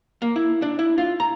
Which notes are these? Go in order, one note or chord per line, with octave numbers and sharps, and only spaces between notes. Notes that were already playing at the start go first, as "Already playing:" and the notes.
A#3
E4
D4
E4
F4
A#5